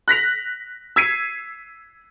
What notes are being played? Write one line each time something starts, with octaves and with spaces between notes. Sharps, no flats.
F#6 A#6 B6 F7
E6 G#6 B6 C7 D#7